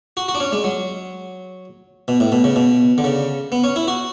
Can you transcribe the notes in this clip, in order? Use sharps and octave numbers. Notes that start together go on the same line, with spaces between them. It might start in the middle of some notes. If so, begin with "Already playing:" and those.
F#4
F#4
D4
C#4
G#3
F#3
B2
A2
B2
C#3
B2
D3
C#3
B3
C#4
E4
F#4